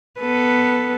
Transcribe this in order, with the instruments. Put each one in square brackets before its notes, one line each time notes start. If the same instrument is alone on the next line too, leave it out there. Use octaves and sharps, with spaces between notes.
[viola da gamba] B3 A4 B4